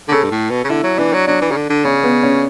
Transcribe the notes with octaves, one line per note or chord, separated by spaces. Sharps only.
D3
C#3 A4
G2
A2
B2
C#3
D3 E4
F#3
E3 D4
F#3
F#3 D4
E3
C#3
D3
D3
C#3 C#4
B3
C#4